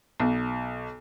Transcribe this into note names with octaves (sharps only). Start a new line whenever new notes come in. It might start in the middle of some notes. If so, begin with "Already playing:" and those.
B1